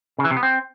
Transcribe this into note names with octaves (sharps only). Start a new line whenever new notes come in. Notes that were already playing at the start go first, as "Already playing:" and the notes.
C#3
E3
C3
B3
C4